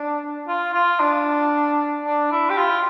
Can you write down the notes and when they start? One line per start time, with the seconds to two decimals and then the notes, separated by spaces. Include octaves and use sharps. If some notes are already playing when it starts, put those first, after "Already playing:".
Already playing: D4
0.48 F4
0.74 F4
1.00 D4
2.05 D4
2.31 E4
2.50 G4
2.57 F4